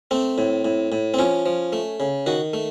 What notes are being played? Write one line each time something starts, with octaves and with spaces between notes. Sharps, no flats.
A3 C4
A2
A2
A2
C4
F3 C#4
F3
A3
C#3
D#3 F#4
A3